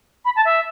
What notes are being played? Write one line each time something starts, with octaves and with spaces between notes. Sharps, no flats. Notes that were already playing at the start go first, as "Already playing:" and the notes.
B5
A5
E5